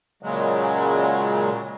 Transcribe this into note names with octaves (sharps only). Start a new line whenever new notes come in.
A#2 C#3 F#3 G#3